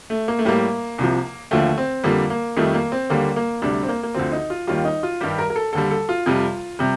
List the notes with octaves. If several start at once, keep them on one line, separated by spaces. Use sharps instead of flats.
A3
A#3
A3
A2 G3 A#3
C2 C3 F3
D#2 D3 F3 A3
C4
F2 D3 G3 A#3
A#3
F2 D#3 G3 A3
A#3
C4
D#2 D3 G3 A#3
A#3
D2 C3 G3 D4
C4
A#3
A#3
D2 D3 F3 C4
D#4
F4
D#2 D#3 G3 F4
D#4
F4
G2 D#3 G3 G4
A#4
A#4
A4
D#2 D3 G3 A4
A4
F4
F2 C3 G3 F4
C3 G3